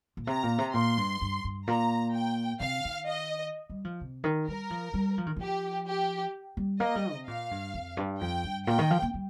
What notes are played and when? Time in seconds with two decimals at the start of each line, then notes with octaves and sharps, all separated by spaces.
0.17 A#2
0.27 C3 A#5
0.43 A#2
0.58 C3
0.74 A#2 C6
0.97 G2
1.21 G2
1.44 G2
1.67 A#2 A#5
2.14 G5
2.60 C3 F5
2.85 D#3
3.08 D#5
3.70 G3
3.85 F3
4.01 C3
4.24 D#3
4.47 G3 A#4
4.70 F3
4.94 G3
5.18 F3
5.26 D#3
5.36 F3 G4
5.87 G4
6.57 G3
6.80 A#3 D#5
6.96 G3
7.12 C3
7.27 A#2 F5
7.51 G2
7.74 F2
7.97 G2
8.20 F2 G5
8.44 G2
8.67 A#2 G5
8.79 D#3
8.90 F3
9.02 A#3
9.14 G3